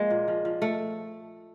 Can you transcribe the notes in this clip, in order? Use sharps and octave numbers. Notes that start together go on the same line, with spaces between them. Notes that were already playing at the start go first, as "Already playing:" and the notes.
Already playing: F3 G#3 A#3
A#2
F3
F3
A3